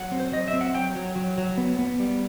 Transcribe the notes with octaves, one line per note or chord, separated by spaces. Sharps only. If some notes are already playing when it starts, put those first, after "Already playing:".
Already playing: F#3 F#5
C4
C5
F#3 D#5
E5
C4
F#5
F#3 G5
F#3
F#3
F#3
B3
B3
G3